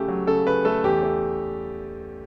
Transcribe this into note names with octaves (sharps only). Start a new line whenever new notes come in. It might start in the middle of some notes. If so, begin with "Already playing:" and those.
Already playing: C#3 A3 G4
F#3
C#3 A4
C#3 B4
A3 A4
E2 G4
A3